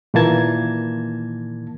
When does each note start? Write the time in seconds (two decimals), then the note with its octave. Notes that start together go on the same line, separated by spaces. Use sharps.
0.14 A#2 D#3 E3 A#3 A5 G#6